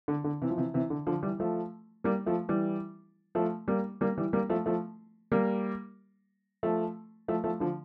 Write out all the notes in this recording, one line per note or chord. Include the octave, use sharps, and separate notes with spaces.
D3
D3
C3 E3
F3
C3 E3
C3 E3
D3
D3 F3
E3 G3
F3 A3
G3 A#3
F3 A3
E3 G3
F3 A3
G3 A#3
G3 A#3
E3 G3
G3 A#3
F3 A3
F3 A3
G3 A#3
F3 A3
F3 A3
F3 A3
D3 F3